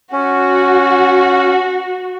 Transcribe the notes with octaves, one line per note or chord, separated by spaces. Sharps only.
C#4 F#4